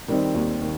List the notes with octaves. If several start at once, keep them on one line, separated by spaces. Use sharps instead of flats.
D#3 G3 C4 D#4
D#2
D#3